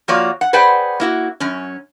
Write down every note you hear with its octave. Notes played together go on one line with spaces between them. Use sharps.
F3 A#3 F4 F#4 C#5 D5
F#5
G#4 B4 C5 D5 F#5 G5
A#3 E4 F#4
F#2 C#4